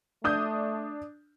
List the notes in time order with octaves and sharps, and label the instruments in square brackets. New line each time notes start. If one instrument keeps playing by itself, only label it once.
[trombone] A3 [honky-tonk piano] D4 D#6 G6